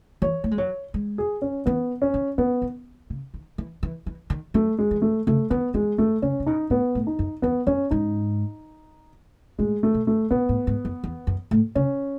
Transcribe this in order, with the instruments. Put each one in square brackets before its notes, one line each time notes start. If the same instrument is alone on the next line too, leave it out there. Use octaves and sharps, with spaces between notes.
[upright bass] E3 [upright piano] C#5
[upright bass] A3
G#3
[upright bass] F#3 [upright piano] C#5
[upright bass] G#3
[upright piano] G#4
C#4
[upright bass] E3 [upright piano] B3
[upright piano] C#4
[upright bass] D#3
[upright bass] E3 [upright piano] B3
[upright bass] D#3
C#3
D#3
E3
E3
E3
D#3
[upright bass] F#3 [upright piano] A3
[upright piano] G#3
[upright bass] E3
[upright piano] A3
[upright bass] C#3 [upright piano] A3
[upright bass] D#3 [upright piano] B3
[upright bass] E3 [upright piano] G#3
[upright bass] D#3 [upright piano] A3
[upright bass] C#3 [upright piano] C#4
[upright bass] C#3
[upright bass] B2 [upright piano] D#4
[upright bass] A2 [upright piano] B3
[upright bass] A2
[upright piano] D#4
[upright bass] F#2
[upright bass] E2 [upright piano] B3
[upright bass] F#2 [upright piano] C#4
[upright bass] G#2 [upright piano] D#4
[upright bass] A2 [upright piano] G#3
[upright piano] A3
[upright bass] B2
[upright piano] A3
[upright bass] B2 [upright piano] B3
[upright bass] A2
G#2
F#2
E2
F#2
A2
[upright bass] C#3 [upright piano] C#4